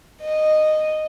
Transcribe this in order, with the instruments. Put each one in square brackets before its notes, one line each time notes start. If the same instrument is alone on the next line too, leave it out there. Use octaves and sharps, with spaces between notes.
[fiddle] D#5